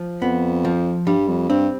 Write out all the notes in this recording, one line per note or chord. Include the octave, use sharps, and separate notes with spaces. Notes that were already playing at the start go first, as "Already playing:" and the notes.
Already playing: F3
F2 B3
F3
G2 G3
F2
G2 C4